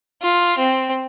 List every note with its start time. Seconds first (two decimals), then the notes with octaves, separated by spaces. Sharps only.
0.22 F4
0.58 C4